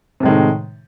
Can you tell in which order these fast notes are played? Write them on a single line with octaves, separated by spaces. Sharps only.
C3 A2 G#3 D#3